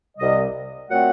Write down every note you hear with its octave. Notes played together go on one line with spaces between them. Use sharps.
C2 C3 G3 D#5
A#2 F#3 A3 C4 F#5